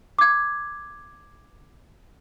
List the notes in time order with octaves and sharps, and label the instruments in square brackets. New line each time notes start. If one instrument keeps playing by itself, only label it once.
[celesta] D6 G#6